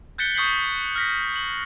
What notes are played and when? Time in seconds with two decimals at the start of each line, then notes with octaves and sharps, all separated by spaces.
0.18 F#6 G6 A6 B6 C#7 G7
0.35 C#6 D#6 G6 B6 C7 F#7
0.96 F6 A#6 B6
1.36 F#7